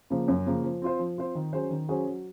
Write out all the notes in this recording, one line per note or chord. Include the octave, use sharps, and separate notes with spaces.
C#3 F3 A#3
F#2
C#3 F3 A#3
F3
C4 F4 C5
F3
C4 F4 C5
D#3
F#3 C#4 G#4 C5
D#3
F#3 C#4 G#4 C5
F#3